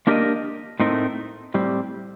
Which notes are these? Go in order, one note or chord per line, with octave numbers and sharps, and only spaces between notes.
A#3 D4 G4 A#4 D#5
A2 A3 C4 D#4 A#4
A2 G3 C4